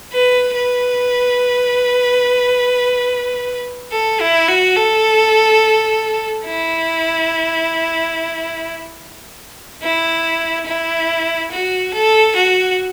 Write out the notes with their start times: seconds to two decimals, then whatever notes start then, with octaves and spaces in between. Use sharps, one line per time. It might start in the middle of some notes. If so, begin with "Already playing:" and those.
0.12 B4
0.55 B4
3.92 A4
4.20 E4
4.49 F#4
4.76 A4
6.45 E4
9.82 E4
10.66 E4
11.51 F#4
11.94 A4
12.36 F#4